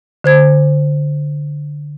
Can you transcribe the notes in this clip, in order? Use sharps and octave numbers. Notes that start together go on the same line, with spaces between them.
D3 C5 G#6